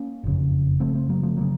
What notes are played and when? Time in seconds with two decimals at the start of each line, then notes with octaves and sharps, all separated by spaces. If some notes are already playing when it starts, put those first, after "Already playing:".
Already playing: A#3 C#4
0.24 F#1 F2 C#3
0.80 F#1 F2 C#3 A3 C4
0.95 A3 C4
1.09 F#3 A#3
1.23 F3 A3
1.38 C#3 F#3 A#3